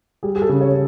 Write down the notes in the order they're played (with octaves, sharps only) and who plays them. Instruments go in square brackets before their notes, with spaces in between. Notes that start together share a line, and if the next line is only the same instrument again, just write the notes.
[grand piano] G3 G#4
G#4
A4
C#3
C#5